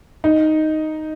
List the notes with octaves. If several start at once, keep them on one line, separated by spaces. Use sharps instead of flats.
D#4